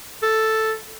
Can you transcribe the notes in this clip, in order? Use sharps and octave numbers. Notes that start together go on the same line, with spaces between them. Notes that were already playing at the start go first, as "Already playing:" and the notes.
A4